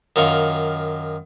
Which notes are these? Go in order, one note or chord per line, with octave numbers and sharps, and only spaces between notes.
F#2 D#3 F4 C#6